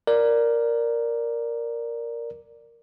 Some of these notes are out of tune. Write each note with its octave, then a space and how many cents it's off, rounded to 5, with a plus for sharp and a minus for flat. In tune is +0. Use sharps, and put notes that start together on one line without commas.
A#4 +0 D5 +0